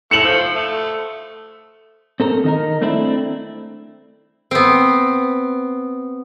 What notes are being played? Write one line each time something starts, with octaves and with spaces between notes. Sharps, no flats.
A3 C#7 E7 F#7
F3
A3
C4 A4 A#4
D#3 D#4 A#4
A3 C4 D4 E4
B3 C4